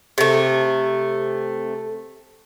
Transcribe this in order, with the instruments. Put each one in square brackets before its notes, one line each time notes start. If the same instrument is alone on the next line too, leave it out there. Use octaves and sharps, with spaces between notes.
[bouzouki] C3 A3